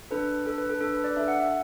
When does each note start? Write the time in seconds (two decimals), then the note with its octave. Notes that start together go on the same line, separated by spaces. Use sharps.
0.11 D4 A4 B4
0.46 D4 A4
0.58 B4
0.70 A4
0.81 D4 A4
0.93 B4
1.04 D5
1.17 D4 A4 E5
1.28 F#5
1.40 E5